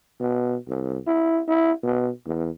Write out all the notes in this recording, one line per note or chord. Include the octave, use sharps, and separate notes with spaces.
B2
C2
E4
E4
B2
E2